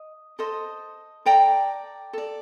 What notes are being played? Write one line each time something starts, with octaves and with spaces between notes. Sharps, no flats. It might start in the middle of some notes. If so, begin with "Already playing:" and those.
Already playing: D#5
A4 C5 D#5
A4 D5 G5 A#5
A4 D5